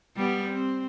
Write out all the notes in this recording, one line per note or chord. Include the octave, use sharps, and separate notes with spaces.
G3 B3
C4